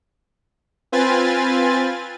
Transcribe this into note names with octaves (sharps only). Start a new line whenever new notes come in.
C4 F4 B4 G#5 A6